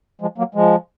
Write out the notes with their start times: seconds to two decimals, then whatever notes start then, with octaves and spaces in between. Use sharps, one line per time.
0.21 F3 G#3
0.38 F#3 A#3
0.55 F3 G#3